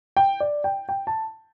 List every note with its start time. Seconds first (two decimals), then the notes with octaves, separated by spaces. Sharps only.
0.17 G5
0.40 D5
0.64 G5
0.89 G5
1.07 A5